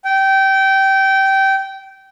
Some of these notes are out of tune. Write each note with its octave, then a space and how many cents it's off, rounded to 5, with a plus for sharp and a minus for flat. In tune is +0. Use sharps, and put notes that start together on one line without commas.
G5 -20